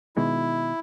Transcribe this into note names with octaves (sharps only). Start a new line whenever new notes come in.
B2 D#3 G#3 E4